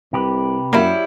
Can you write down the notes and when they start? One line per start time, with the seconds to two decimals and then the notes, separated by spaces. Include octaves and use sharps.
0.13 C2 C3 G4 B4
0.73 F#2 F#3 G3 A#3 E4